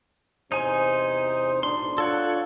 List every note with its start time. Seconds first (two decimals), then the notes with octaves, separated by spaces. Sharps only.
0.52 E2 C3 D#4 C5 G#5
1.63 B1 A2 D4 C6
1.98 D4 F4 A4 C#5 F#5